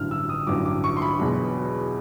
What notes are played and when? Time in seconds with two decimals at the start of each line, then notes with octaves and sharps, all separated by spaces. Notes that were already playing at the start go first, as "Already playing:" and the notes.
Already playing: A1 G2 D3 F#3 F6
0.11 E6
0.29 D#6
0.47 A1 G2 D3 F#3 D6
0.66 D6
0.84 C#6
0.97 C6
1.02 B5
1.19 E2 B2 F#3